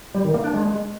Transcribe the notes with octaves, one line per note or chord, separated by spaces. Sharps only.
G3
D#3
A#3
D4
G#3